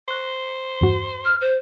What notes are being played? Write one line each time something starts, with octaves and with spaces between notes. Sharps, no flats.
C5 C#6 F#6 A#6
E2 G2 F#4
F6
C5